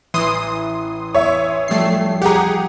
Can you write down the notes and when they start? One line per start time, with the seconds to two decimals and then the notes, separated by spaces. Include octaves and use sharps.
0.14 A1 E3 C6 D#6
1.14 C#5 E5
1.68 F3 G3 A3 C#4 C7
2.22 G4 G#4 F#5 A#5